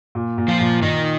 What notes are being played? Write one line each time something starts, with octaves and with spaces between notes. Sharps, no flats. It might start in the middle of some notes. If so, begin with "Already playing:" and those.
A#2
A#2
F3 F4
A#2
A#2 D#3 D#4